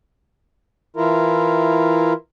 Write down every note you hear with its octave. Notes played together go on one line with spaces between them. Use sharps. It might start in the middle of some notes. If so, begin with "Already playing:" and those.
E3 E4 F4 A#4